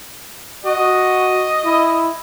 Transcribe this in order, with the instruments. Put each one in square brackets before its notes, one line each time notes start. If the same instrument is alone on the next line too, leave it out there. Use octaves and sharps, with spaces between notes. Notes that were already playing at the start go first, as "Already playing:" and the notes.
[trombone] F#4 [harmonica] D#5
[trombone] E4